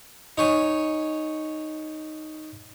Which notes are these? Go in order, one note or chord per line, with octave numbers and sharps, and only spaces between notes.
D#4 C#5 G#5